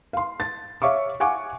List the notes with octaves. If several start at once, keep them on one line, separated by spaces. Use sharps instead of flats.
F5 C6
A6
C#5 E5 F5 C#6 D6
F5 F#5 G#5 C#6 D6